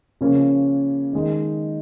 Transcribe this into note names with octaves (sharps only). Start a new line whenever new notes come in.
C#3 F3 A#3 C#4
D#3 G#3 D#4